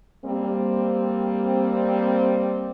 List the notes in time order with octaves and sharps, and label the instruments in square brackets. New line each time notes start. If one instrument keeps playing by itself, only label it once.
[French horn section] G3 A#3 C4